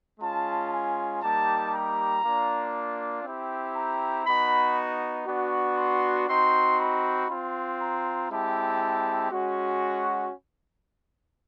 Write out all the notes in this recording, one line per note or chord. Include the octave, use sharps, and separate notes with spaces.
G#3 C#4 F4 A5
G#5
G3 A#3 D#4 G4 A5
A#5
A#3 D4 F4
C4 E4 G4
A#5
B3 D#4 F#4 B5
B3 D4 F#4
C6
C4 D#4 F#4 C6
B5
C4 F4
A#5
G#3 C4 E4 G4 A5
G#3 C#4 F#4